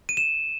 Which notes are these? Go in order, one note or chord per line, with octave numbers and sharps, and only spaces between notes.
D#7
E7